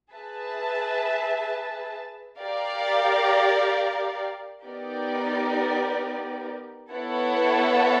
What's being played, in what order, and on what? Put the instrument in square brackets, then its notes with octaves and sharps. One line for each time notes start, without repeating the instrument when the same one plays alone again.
[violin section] G#4 B4 E5 A5
G4 A#4 D5 F5
B3 D#4 G4 A#4 D5
B3 E4 A4 C#5 F#5